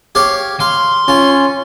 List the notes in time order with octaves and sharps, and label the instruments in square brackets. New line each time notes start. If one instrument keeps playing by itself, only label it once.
[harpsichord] G4 C#5 F5
[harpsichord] F5 [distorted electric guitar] C6
[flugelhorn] C#4 [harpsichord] F4